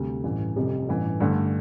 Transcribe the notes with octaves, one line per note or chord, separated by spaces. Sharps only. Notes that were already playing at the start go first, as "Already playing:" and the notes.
Already playing: D2 C3 G3
A1 G2 E3
F1 F2 C3 G3
A1 G2 E3
G2 D3 A3